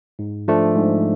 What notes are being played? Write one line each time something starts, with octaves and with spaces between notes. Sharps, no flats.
G#2
F3 A3 D4
G#2